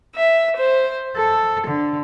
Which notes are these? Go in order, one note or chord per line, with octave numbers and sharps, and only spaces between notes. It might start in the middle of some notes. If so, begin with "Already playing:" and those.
E5
C5
A4
D3